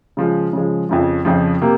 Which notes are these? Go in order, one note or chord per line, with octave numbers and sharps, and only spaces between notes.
C#3 F3 G#3
C#3 F3 G#3
F2 C#3 F3
F2 C#3 F3
C3 A#3